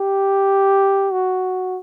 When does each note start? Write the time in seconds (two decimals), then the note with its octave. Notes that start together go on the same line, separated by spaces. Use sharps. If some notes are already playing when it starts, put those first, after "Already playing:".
Already playing: G4
1.13 F#4